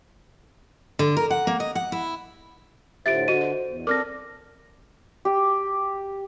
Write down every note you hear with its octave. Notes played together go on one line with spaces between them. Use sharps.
D3
A#4
F#5
A#3
D#5
F#5
E4
A2 D3 F4 G4 C5 E5 A6 D7
D3 F#4 D#5 D#7
D#5
E2
C4 A4 A#4 D5 D6 F6 A#6
G4